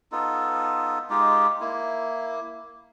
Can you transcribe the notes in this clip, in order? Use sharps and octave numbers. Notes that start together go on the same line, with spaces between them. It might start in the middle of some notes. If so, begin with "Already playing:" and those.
B3 D#4 F4 A4
G#3 D#4 F4 G4
A#3 E4